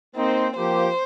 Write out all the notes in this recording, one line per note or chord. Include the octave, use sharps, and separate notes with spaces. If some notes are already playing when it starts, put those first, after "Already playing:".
A#3 C4 D#4 C5
F3 A#3 G4 C5